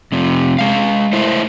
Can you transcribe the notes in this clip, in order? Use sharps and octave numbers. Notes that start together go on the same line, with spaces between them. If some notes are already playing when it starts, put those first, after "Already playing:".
F2 C3
G#3 F5
A3 E4 C5